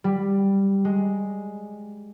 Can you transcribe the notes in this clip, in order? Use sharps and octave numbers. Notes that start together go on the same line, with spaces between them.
G3
G#3